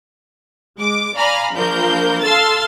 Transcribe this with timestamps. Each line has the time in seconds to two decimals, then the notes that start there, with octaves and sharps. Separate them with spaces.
0.78 G#3 D6
1.17 D5 F5 G#5 A#5 B5 F6
1.54 A#1 F3 A#3 A#4 G6
2.23 A4 F5 C6 E6 A6